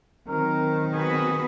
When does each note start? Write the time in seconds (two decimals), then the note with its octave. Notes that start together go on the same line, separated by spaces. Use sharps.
0.28 D#3 F#3 C4 A#4
0.92 B3 F#4 G#4 B4